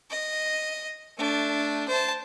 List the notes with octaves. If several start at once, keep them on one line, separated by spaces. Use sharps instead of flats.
D#5
A3 D4
C5 A5